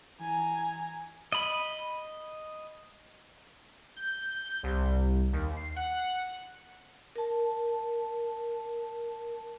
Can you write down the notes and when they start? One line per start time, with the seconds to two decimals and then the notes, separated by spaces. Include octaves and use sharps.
0.20 E3 G#5 A#5
1.32 D#5 B5
3.96 G6
4.63 C2
5.33 D#2
5.57 C7
5.76 F#5
7.16 A#4 A5